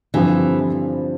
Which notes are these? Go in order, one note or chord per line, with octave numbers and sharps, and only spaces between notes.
G2 D3 E3 F3 C4